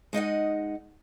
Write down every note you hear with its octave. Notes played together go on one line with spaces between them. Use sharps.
G#3 D#4 D#5 F#5